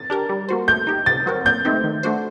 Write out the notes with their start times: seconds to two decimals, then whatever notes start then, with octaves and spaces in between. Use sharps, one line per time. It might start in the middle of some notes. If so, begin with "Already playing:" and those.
Already playing: A6
0.10 D4 G4 A#4
0.29 G3
0.49 A#3 F#4 C5
0.68 A3 G6
0.87 D#4 G4
1.06 C3 A6
1.26 F#3 C4 F#4 A#4
1.45 A#2 G6
1.65 A3 C4 D#4 G4
1.84 D#3
2.03 A3 D4 F#4 C5